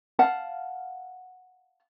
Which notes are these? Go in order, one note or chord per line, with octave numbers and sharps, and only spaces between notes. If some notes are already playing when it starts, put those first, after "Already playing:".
F5 F#5 A5